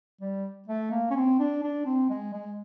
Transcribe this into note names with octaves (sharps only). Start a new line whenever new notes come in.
G3
A3
A#3
C#4
C4
D4
D4
C4
G#3
G#3